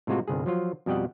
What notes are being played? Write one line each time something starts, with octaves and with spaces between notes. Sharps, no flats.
A2 C3 G#3 F4 F#4
G1 C2 G2 G#4
F3 F#3 F4
F2 B2 G3 G4 D#5 F#5